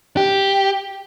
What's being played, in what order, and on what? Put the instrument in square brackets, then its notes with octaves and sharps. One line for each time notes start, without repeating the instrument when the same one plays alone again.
[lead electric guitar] G4